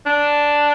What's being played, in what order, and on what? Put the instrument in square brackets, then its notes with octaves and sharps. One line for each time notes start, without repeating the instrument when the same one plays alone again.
[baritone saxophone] D4